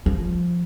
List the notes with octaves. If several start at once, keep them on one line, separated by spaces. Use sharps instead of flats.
F3